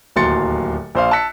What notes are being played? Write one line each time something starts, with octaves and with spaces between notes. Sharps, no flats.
D1 D#2 F#3 C6 A6 C#7
A#1 C5 F5
A5 E6 F#6 B6 C#7